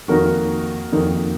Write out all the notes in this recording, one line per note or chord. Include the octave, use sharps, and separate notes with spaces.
F2 D#3 A#3 D#4 F#4 A#4
F2 D#3 A#3 D#4